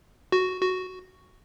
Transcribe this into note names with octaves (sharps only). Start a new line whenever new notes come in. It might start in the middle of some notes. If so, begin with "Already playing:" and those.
F#4
F#4